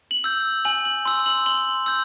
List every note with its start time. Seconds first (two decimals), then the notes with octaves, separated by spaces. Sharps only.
0.11 F#7
0.24 E6 G6
0.65 G#5 F#7
0.85 F#7
1.05 C6 E6
1.26 F#7
1.46 C6 F#7
1.86 E6 G6